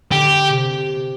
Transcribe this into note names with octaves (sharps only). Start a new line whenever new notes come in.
D3 G4
C3